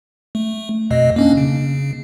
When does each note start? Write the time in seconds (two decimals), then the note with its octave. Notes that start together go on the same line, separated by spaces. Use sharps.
0.35 A3
0.91 F2 B2 D#5
1.16 A#3 C#4 D4
1.37 C#3